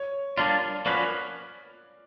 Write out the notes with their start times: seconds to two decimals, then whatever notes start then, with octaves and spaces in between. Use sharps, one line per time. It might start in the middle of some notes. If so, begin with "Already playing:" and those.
Already playing: C#5
0.37 G3 A#3 D4 F4 D5
0.86 F3 A#3 C#4 F#4 B4 D5